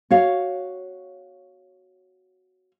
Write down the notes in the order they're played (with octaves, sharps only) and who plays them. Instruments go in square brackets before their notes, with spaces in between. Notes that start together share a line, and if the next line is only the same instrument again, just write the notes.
[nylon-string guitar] F#4 C#5 F5